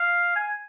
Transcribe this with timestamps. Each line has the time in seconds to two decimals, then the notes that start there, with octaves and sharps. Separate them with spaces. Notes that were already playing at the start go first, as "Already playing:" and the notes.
Already playing: F5
0.36 G#5